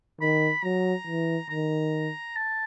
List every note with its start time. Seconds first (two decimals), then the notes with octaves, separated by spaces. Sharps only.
0.21 D#3 B5
0.64 F#3 A#5
1.07 E3
1.50 D#3 A#5
2.36 A5